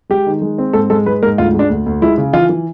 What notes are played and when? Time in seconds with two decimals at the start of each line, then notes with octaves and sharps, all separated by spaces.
0.09 G#3 G4
0.26 D#3
0.42 G#3
0.58 C4
0.73 G#2 A4
0.90 G#3 A4
1.06 G#3 B4
1.23 G#2 A#4
1.38 D2 F4
1.54 G#3
1.59 D4
1.70 D2
1.86 D2
2.02 G#3 E4
2.18 C#3
2.33 E3 F4
2.49 E3